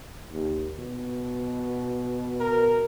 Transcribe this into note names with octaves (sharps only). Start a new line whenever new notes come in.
D#2
B2
A#4